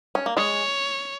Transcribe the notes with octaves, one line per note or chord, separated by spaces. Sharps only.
C#4
A#3
G#3 C#5